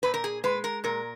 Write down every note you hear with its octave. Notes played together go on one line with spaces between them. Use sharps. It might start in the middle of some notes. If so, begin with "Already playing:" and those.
A#2 B4
A#4
G#4
G#3 B4
A#4
A#2 A#4